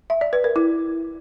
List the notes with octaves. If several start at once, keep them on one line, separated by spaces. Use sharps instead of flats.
E5
D5
B4
A#4
E4